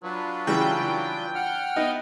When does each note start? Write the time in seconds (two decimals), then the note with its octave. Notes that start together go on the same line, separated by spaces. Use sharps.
0.03 F#3 D4 F4 B4
0.47 C#3 E3 G3 G5
1.35 F#5 F6
1.76 B3 D#4